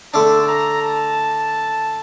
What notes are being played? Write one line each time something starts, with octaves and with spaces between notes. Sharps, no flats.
D3 A3 D4 A5
A#5
A5